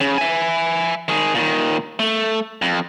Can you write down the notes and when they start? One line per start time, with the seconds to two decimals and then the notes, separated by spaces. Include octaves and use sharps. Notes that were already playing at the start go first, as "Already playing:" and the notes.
0.01 C#3
0.18 E5 G#5
1.08 D#3 G#4
1.35 A#2 D#3
1.99 A3
2.62 F2